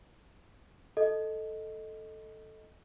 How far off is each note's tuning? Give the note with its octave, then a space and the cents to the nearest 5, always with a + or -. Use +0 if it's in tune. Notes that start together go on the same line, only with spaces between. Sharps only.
A4 +0 D#5 +0